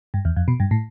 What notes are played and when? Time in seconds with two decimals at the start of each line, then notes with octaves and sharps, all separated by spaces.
0.14 G2
0.25 E2
0.36 F2
0.48 B2
0.60 G2
0.71 A2